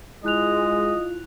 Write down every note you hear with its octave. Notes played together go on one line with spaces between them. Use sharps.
G#3 E4 F4 D#5 F#6 F7